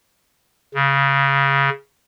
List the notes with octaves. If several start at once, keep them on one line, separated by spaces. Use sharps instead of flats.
C#3